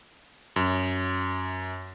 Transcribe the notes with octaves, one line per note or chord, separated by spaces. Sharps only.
F#2